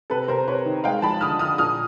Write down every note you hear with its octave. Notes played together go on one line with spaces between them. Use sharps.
C3 A4 B4
C3 A#4 C5
C3 B4 C#5
D#3
G#3 F5 G5
F3 A5 B5
D3 D#6 F6
D3 D#6 F6
A#2 D#6 F6